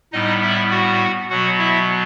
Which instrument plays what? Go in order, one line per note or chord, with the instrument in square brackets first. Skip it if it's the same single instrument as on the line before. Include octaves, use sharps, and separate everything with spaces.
[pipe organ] A2 G3 B3 D#4 D#5
E4 E5
F#4 F#5
B2 F#3 B3 F#4 F#5
E4 E5